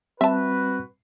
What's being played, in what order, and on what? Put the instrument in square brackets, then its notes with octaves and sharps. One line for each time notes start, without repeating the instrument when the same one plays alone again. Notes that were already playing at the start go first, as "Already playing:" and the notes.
[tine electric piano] G3 C4 [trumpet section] F#4 B4 [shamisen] E5 A5